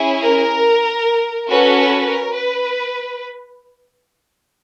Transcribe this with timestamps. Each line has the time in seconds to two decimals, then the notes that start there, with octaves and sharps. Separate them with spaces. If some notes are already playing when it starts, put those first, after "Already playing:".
Already playing: C#4 E4 G#4
0.23 A#4
1.49 C#4 F#4 A4 B4
1.78 B4
2.06 A#4
2.34 B4